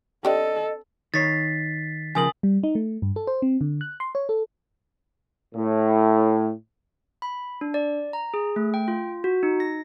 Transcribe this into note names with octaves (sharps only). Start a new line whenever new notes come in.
C4 D4 G4 A4 D#5
D#3 C#5 A6 B6 C7
C#3 F3 A#4 G#5 D#6 F#7
G3
D#4
A3
G2
A4
C5
C4
D3
F#6
C6
C#5
A4
A2
B5
D4
D5
A#5
G#4
A3
G5
F4
F#4
D#4
A#6